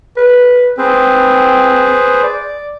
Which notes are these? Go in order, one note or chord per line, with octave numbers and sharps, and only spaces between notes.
B4
C4 G#4 B4 C5
D5